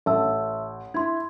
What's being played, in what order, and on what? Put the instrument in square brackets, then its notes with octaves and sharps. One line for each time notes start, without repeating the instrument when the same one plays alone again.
[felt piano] A1 [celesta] E5 A5 E6
[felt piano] E4 [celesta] C6 G#6